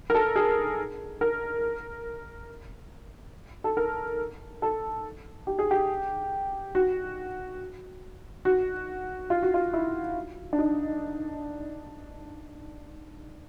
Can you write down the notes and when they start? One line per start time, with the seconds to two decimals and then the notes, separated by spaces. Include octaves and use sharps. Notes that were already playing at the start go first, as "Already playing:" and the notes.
0.10 A#4
0.14 A4
0.36 G#4
1.21 A#4
3.64 A4
3.77 A#4
4.62 A4
5.47 G4
5.59 G#4
5.71 G4
6.75 F#4
8.45 F#4
9.30 F4
9.42 F#4
9.54 F4
9.73 E4
10.53 D4
10.58 D#4